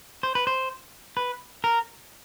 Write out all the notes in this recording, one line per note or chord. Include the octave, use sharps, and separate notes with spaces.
C5
B4
C5
B4
A#4